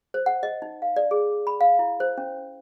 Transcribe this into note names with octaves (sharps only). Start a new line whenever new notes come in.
C5
F#5
D#5
D#4
F5
D5
G#4
B5
F5
E4
C5
C#4